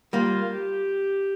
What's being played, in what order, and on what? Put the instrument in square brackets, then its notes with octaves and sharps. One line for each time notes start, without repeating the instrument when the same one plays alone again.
[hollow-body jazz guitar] G3 A#3 [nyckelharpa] F4
[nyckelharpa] G4